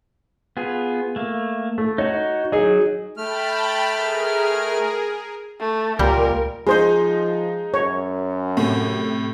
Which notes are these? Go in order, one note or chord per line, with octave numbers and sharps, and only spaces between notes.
B3 F4 G#4
A3 A#3
A3
D#4 F#4 C#5
F#3 D#4 G#4
A3 G5 A5 B5 F6
G#4 A#4
A3
C#2 A#2 G3 A#4
F3 G#3 D#4 G#4 C5
F#2 C#5
A2 C3